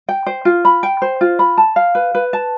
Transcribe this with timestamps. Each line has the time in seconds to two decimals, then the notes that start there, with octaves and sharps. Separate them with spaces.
0.09 G5
0.26 C5
0.45 F4
0.65 B5
0.83 G5
1.02 C5
1.21 F4
1.39 B5
1.58 A5
1.76 F5
1.95 B4
2.15 B4
2.33 A5